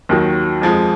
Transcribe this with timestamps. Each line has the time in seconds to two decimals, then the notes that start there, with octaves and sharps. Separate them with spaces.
0.09 D#2 D#3 F#3
0.61 F2 F3 G#3